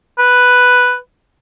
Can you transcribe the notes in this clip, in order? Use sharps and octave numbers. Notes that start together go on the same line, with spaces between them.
B4